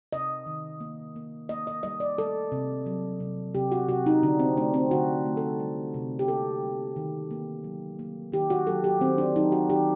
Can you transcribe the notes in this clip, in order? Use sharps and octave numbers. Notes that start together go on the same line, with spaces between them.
C3 D#5
D#3
A#3
A#3
A#3 D#5
D#5
G3 D#5
D5
G3 A4
C3
F#3
C3
C3 G4
F#4
C3 F#4
D#4
D3 D4
C4
A3 D4
C4
D3 F#4
A3
A4
G3
C3
G4
A#3 A4
G3
D#3
A#3
F#3
A#3
D#3 G4
F#4
F#3 A4
G4
D#3 C4
D4
F#3 D#4
F#4
D#3 G4